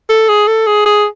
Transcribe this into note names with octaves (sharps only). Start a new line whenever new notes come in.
A4
G#4
A4
G#4
G#4